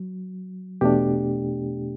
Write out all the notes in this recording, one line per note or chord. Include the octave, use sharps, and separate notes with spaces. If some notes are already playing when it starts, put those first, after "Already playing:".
Already playing: F#3
E2 B2 A3 D4 G4